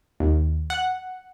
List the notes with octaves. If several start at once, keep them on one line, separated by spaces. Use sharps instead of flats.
D#2
F#5